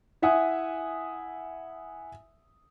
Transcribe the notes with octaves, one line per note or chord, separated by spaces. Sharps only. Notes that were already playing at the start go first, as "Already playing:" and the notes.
E4 E5 F#5 G#5 D#6